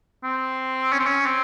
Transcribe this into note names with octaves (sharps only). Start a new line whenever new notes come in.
C4
C#4
C4
C#4
C4